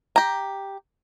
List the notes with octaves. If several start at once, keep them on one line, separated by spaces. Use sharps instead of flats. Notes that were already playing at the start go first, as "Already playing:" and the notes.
G4 A#5